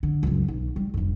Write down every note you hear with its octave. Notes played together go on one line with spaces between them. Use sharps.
D3
C#2 F#2
B1
G3
F1 G2